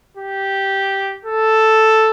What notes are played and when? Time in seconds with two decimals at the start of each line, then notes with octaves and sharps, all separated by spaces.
0.17 G4
1.25 A4